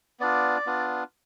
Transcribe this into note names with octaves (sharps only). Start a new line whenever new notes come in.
B3 D4 F4 D5
B3 D4 F4